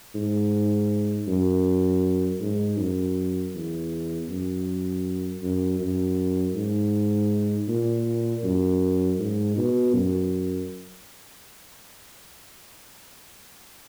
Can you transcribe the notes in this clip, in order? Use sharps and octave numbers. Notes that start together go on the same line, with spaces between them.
G#2
F#2
G#2
F#2
E2
F#2
F#2
F#2
G#2
A#2
F#2
G#2
B2
F#2